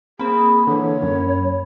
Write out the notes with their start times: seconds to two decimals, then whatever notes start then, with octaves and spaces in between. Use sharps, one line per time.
0.19 A#3 C4 G#4 B5
0.67 D3 E3 C#5
1.02 F#2